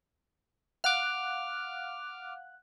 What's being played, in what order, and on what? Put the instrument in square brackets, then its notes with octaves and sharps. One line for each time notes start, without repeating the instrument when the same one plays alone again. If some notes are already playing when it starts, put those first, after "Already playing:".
[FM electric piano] F5 F#5 F#6 [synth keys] D6 F6